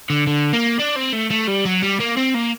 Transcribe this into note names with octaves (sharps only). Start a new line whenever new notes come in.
D3
D3
A#3
D4
C4
A3
A3
G3
F#3
G3
A#3
C4
A#3